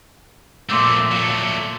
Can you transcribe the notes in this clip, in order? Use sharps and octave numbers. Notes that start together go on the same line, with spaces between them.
A#2 F3 A3 C4 C6 D6 E6
F#3 A3